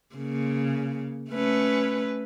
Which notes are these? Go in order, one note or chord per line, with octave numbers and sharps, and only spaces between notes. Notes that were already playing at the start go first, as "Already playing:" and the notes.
C#3 A#3
A3 C#4 B4